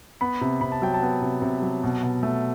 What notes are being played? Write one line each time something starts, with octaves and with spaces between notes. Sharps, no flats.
B3 B5
C3
C3 B5
A5
F#3 G5
A5
B3
C3
C3
F#3
B2
B2
A3